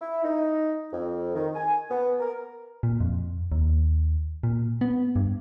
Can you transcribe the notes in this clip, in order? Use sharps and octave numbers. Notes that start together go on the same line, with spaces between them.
E4
D#4
F2
D#3
G#5
B3
A#4
A#2
F2
D#2
A#2
B3
G2